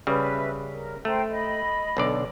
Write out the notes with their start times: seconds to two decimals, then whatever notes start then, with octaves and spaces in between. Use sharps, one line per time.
0.07 C#3 G3 B4 E5
0.72 A#4
1.05 A3 C5 G5 A#5
1.30 D#5 B5
1.97 B1 D3 D5